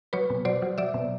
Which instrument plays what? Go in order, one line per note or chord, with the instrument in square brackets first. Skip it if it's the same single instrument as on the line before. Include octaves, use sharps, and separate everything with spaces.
[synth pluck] F#3 B4 C#5
B2
F#3 C5 D5
F#3
F#3 D5 E5
B2